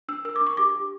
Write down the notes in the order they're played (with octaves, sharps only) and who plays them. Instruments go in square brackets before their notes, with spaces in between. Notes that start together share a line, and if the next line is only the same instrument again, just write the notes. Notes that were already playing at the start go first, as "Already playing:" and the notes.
[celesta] D4 E6
A#4 E6
D6
D4
C#6
G4 D6
G4